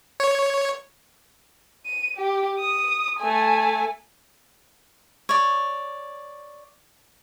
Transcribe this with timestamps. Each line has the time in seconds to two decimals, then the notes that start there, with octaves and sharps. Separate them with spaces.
0.20 C#5
1.86 D#7
2.17 G4
2.59 D#6
3.20 A3 G#5
5.29 C#5 D5